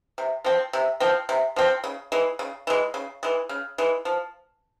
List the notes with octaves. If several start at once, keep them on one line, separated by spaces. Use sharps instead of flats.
C3
F3 C4
C3
F3 C4
C3
F3 C4
C#3
E3 G#3
C#3
E3 G#3
C#3
E3 G#3
C#3
E3 G#3
F3